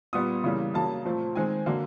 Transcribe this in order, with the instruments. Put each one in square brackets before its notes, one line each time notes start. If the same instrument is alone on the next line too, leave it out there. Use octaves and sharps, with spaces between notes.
[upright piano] A#2 G3 B3 D#6
C#3 E3 G3 A#3
C#3 F#3 A#3 A5
A#2 F3 A3 C4
D#3 G#3 C4 G#5
D3 F#3 A#3